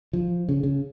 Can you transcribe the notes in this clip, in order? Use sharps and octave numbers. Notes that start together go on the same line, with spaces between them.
F3
C#3
C#3